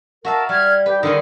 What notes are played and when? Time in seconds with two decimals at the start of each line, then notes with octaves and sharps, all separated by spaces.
0.25 F#4 A#4 E5 F5 A5
0.49 G3 F6 G#6
0.86 G4 B4
1.03 D3 D#3 D#4 G#4